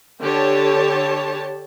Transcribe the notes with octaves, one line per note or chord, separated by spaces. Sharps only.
D3 G4 C#5 A5